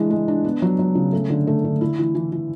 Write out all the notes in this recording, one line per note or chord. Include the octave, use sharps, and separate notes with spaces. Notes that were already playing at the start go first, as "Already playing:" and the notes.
Already playing: E3 G#3 D4
G#3
D4
B3
F#3
F#3
C#3
A3
D3
A3
D3
E4
E3
E3
E3